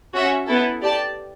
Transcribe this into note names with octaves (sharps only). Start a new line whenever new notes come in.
C#4 F#4 C#5 E5
B3 E4 A4
G4 D5 A5